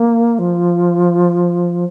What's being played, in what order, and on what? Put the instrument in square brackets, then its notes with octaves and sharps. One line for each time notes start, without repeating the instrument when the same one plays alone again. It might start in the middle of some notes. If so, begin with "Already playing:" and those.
Already playing: [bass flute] A#3
F3